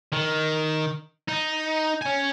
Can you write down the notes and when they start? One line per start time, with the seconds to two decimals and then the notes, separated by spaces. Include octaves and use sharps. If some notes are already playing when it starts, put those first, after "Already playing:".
0.13 D#3
1.29 D#4
2.01 C#5 G#5